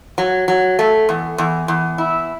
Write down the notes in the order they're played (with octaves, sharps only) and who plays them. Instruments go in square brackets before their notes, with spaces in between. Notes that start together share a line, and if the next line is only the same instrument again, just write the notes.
[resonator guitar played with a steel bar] F#3
F#3
A3
E2
E2
E2
E4